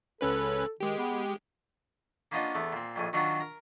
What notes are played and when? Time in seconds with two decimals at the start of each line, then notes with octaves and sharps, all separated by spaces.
0.21 C#2 C#4 A4 B4
0.80 D#3 G#3 G4
0.98 B3
2.32 A#3 B3 C#4 D4 F4 D#5
2.55 E2 A3 B3
2.72 A#2 C4
2.96 A#1 F2 A2 G#5
3.13 D#3 F#3 C4 D4 F4 F#4
3.40 A#4 A#5